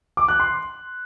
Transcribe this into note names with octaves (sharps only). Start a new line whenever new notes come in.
D6
F#6
C6